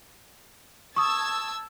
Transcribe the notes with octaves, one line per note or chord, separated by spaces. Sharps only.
A5 C#6 D#6 E6 G#6